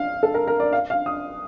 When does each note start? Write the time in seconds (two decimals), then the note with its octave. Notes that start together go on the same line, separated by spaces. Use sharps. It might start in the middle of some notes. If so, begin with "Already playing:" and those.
Already playing: F5
0.23 A4
0.34 A#4
0.47 A#4
0.60 D5
0.73 F5
0.90 F5
1.06 D#6